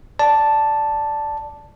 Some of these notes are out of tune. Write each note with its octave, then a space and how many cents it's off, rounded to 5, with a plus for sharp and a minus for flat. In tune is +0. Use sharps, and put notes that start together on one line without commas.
D5 +0 A5 +0